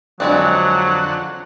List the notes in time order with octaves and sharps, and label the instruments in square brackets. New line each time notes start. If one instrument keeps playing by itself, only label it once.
[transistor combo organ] F2 D3 F#5 [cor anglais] F#3 [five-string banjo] G#3 C4 D4